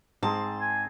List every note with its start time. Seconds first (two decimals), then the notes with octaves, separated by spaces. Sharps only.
0.23 G#2 C4 G#4 A5
0.61 G#5